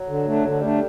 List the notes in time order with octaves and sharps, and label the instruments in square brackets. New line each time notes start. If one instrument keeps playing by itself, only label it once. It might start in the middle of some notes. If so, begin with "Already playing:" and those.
Already playing: [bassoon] F#3
[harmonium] D3
A3 D4
[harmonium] D3 [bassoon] F#3
[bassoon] G3 [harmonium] A3 D4